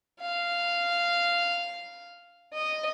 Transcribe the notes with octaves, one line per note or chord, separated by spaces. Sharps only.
F5
D#5